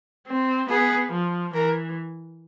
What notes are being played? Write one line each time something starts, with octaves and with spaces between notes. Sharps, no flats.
C4
B3 G#4
F3
E3 A#4